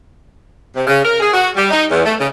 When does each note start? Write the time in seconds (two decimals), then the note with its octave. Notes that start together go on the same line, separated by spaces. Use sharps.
0.75 C3
0.87 C#3
1.03 A#4
1.20 G#4
1.33 F#4
1.56 G3
1.70 D#4
1.90 E2
2.04 A3
2.18 C#3